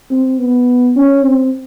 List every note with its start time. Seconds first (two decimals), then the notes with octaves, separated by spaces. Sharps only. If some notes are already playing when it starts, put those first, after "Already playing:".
0.10 C4
0.38 B3
0.96 C#4
1.24 C4